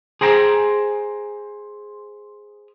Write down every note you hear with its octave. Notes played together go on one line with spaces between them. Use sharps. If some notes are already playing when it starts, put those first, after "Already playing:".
G#4 C5 G5 A#5